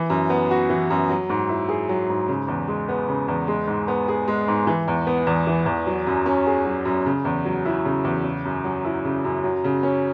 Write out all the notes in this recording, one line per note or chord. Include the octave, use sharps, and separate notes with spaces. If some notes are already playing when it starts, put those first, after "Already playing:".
Already playing: E3
F#2
B3
F#4
E3
F#2
F#3
G#2
E4
G#4
F#3
G#2
C#3
E2
G#3
B3
C#3
E2
G#3
G#2
B3
G#4
G#3
G#2
E3
E2
B3
E2
E3
E2
F#3
F#2
C#4
G#4
F#3
F#2
C#3
E2
F#3
E4
C#3
E2
C#3
F#2
F#3
E4
C#3
F#2
F#3
C#3
C#4